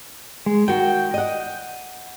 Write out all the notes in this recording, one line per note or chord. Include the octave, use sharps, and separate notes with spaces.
G#3
D#3 F#4 G5
D#5 F#5